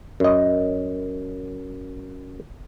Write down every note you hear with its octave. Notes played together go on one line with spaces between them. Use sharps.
F#2 D#5